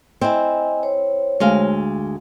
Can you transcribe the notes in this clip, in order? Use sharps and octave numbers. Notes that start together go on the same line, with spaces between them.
C4 E4 D#5 G#5
C5 C#5
D2 G#3 F5